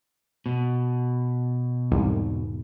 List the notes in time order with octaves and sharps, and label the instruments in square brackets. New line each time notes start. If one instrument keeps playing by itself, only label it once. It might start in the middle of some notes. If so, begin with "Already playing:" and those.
[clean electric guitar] B2
[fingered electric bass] E1 G#2 [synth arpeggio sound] C2